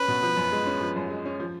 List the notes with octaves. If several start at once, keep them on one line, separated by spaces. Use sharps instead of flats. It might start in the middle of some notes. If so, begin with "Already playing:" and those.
Already playing: C#4 B4
B2
F3
F#2
G#3
C#4
F3
F#2
G#3
C#4
F3